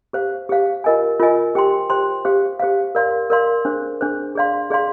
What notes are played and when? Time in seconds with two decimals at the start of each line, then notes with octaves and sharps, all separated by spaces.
0.13 G4 C5 F5
0.49 G4 C5 F5
0.84 F4 A#4 D#5 G#5
1.20 F4 A#4 D#5 G#5
1.55 G4 C5 G5 C6
1.90 G4 C5 G5 C6
2.25 G4 C5 F5
2.59 G4 C5 F5
2.95 A#4 D5 F5 C6
3.30 A#4 D5 F5 C6
3.65 D4 G#4 C5
4.01 D4 G#4 C5
4.35 G#4 D5 F5 C6
4.70 G#4 D5 F5 C6